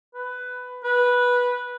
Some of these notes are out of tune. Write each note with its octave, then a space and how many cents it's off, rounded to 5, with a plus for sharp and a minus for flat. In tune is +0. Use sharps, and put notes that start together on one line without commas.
B4 +15
B4 -10